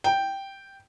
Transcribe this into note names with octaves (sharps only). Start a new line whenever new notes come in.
G5